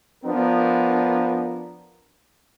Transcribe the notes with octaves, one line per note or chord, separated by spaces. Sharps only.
F3 B3 D4 A#4